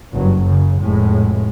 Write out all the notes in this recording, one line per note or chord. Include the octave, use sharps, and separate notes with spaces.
F#1 G2 F#3
F#2 C#3
F1 A2 G#3